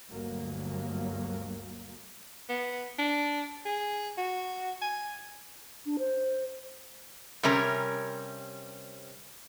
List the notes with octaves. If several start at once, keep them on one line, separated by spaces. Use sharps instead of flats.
G1 D2 F#3 A#3
B3
D4
G#4
F#4
G#5
D4
C5
C3 G3 C#4 A#4